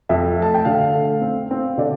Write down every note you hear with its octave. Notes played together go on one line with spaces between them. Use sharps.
F2 E5
A3 A5
G5
D3 F5
A3
C4
C4
D3 D5